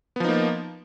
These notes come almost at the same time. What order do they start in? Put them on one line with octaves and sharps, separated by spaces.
B3 F3 D#4 A#3